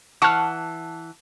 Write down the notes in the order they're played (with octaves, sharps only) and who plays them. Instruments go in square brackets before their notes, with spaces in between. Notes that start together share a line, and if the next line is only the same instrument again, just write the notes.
[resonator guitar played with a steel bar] E3 F#5 A5 [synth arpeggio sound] C#6 F6